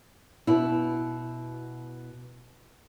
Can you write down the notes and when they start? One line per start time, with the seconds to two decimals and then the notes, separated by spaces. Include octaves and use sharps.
0.47 B2 E4